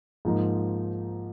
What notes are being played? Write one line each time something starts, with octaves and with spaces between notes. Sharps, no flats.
G#2 F3 A#3 D#4